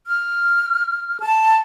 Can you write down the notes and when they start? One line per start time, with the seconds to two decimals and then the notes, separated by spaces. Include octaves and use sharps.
0.07 F6
1.20 A5